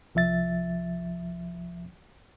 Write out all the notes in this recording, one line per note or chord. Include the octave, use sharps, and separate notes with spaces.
C2 F3 E5 A6